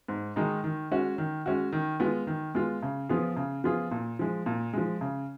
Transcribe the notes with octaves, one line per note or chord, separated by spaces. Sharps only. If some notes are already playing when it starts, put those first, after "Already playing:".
G#2
D#3 G#3 D#4
D#3
G#3 C#4 F#4
D#3
G#3 C#4 F#4
D#3
G#3 B3 F4
D#3
G#3 B3 F4
C#3
F3 B3 F4 G#4
C#3
F3 B3 F4 G#4
A#2
F3 G#3
A#2
F3 G#3
C#3